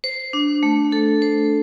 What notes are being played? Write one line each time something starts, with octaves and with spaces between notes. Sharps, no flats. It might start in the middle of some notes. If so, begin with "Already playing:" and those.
C5
D4
A3
A4
C5